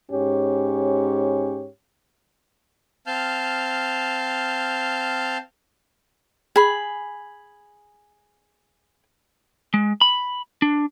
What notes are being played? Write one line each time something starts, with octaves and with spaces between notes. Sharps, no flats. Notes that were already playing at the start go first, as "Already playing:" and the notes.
G#2 C#4 G4 C#5
C4 F5 A5 F6 G6
G#4 B5
G#3
B5
D4